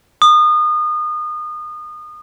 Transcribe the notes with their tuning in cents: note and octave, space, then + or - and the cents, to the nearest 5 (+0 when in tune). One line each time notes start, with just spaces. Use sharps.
D#6 -30